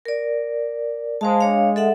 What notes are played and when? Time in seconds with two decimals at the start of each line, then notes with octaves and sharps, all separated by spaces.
0.05 A#4 D5
1.21 G#3 C5 F5 A5
1.40 D4 C#5 F5
1.76 A4 E5 F#5